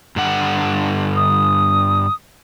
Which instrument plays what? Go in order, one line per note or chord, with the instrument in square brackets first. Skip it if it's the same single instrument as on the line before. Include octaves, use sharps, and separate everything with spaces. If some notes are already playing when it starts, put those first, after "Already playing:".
[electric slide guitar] G2 D3 F#5
[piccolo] D#6